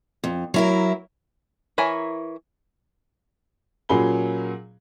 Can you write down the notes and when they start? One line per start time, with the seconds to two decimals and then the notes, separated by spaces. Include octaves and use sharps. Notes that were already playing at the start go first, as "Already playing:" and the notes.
0.24 F2
0.54 F#3 E4 A#4
1.78 E3 E4 A#4 C#5 G#5
3.89 A#2 F#3 C#4 G#4 B5 G7